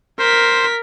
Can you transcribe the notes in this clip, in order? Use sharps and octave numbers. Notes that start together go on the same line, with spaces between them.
A#4 C5 B6